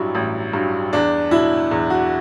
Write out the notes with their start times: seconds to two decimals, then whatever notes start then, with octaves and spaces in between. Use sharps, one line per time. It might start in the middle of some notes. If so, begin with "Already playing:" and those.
Already playing: A1 G2 F#3 E4
0.15 A1
0.53 G2 F#3
0.93 E2 D4
1.31 B2 F#3 E4
1.71 E2
1.90 F#4